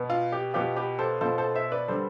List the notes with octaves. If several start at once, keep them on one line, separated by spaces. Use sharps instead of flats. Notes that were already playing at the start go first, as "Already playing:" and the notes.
Already playing: B2 B3
F4
G4
B2 B3 F4 G4 B4
G4 B4
A4 C5
B2 B3 F4 A4 C5
A4 C5
C5 E5
B4 D5
D3 G3 B3 A4 C5